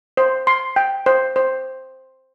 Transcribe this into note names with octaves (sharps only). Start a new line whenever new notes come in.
C5
C6
G5
C5
C5